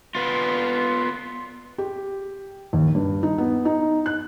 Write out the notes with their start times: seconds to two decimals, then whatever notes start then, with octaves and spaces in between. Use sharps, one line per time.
0.15 B3 F4
1.78 G4
2.73 D#2
2.95 G2
3.23 D#4
3.38 B3
3.65 D#4
4.06 F#6